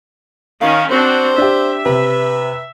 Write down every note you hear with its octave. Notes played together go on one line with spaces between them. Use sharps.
D#3 C#4 F5
C4 D4 F#4 C5
D4 G4 E5
C3 B4